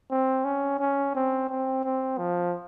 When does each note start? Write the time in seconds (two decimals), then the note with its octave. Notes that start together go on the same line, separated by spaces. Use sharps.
0.11 C4
0.45 C#4
0.79 C#4
1.15 C4
1.50 C4
1.84 C4
2.18 F3